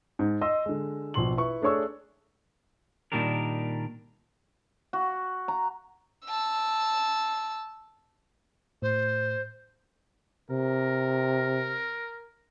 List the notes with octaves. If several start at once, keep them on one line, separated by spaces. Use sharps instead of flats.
G#2
D#5 C6 E6
D3 G#3
A#1 B2 C6 F#7
E4 B4 C#6
A3 D4 G#4 C#5 C#6 E6
A#2 D#3 G3 D4 A#4
F#4
A#5
A5 E6
A2 C5
C3 A#4